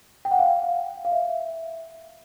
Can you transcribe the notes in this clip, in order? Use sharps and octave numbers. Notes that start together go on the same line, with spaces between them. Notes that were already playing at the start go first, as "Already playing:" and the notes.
G5
F#5
F5
F5
E5